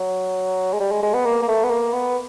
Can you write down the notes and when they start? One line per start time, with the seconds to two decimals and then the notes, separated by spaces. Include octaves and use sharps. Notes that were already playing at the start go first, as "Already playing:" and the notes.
Already playing: F#3
0.73 G#3
0.80 G3
0.92 G#3
1.03 G#3
1.14 B3
1.26 A#3
1.42 A#3
1.48 A3
1.64 B3
1.70 A#3
1.93 B3